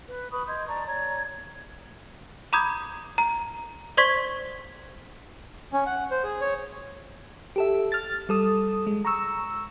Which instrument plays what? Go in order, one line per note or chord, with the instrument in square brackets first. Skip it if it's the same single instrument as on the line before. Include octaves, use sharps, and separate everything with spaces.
[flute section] B4
B4 B5 C#6 D#6
D#5 C6 G6 G#6
D5 A5 A#5 C#6
C#5 D5 A#5 G#6
[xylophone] A#5 B5 D6 D#6 G6 G#6
A#5
C5 D5 C6 C#6 G#6 B6
[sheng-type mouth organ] C#4
F#5
C5
G#4
C#5
[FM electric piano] G4 A4 E5
F6 A6
G3 A4 D#6
G#3
A#5 C#6 E6